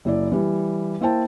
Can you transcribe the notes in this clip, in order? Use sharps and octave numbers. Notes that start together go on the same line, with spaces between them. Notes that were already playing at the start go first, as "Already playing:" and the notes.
F#1 E4 D5
E3 G3
A#3 E4 C5 G5 A5